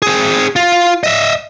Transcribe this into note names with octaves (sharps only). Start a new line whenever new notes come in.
C4 G#4
F4
D#5 E5